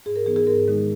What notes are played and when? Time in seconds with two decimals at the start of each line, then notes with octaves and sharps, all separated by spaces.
0.06 G#2 G#4
0.16 A#4
0.26 E3 B3 D#4 G#4
0.36 G#4
0.47 G#2 A#4
0.68 D#3 G#3 D#4